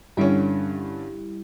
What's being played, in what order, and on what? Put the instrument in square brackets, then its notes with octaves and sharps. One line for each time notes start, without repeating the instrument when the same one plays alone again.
[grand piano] G2 D3 C#4 [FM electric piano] G3 E4 G4